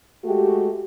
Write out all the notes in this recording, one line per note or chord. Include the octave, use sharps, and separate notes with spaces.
G#3 A3 F#4 G4